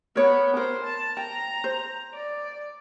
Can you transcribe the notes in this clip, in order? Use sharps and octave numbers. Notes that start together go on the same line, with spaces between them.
B3 A#4 C#5
A#4 C5
A5
G5 A#5
C5
D5